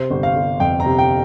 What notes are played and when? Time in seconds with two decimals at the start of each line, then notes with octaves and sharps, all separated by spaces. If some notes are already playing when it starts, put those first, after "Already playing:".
Already playing: C3 C5
0.10 G1
0.23 F5
0.36 G1
0.60 F2 G5
0.80 A#5
0.86 C3
0.98 G5